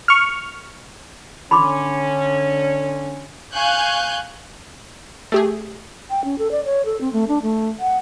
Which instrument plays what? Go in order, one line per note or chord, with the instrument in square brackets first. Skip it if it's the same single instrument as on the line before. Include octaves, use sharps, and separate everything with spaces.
[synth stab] C#6 F6
[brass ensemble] D3 C#4 [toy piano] B5 C6 D6
[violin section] F5 G#5 C#6 F#6 G6
[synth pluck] A3 G4 G#4
[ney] G5
C#4
A4
D5
C#5
A4
C4
A3
D4
A3
F#5